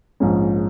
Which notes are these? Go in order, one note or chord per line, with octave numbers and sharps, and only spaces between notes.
A#1 G#2 F3 G#3 C#4